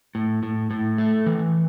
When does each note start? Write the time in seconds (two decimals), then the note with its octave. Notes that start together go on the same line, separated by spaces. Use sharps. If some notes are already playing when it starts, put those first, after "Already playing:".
0.15 A2
0.43 A2
0.71 A2
0.98 A3
1.26 E3